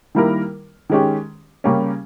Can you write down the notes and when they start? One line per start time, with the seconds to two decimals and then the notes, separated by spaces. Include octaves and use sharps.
0.15 D#3 G3 A#3 E4 A#4
0.89 D#3 G#3 C#4 G4
1.64 C#3 G3 A#3 C#4 G4